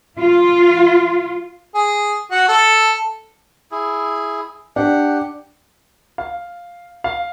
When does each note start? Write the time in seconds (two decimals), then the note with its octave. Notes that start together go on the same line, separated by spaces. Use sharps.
0.18 F4
1.75 G#4
2.31 F#4
2.48 A4
3.71 E4 G#4
4.76 D4 G4 F#5
6.18 F5
7.04 F5